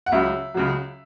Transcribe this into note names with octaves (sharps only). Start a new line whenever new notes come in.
F#5
C#2 C#3 F#3 E5
C#2 C#3 F#3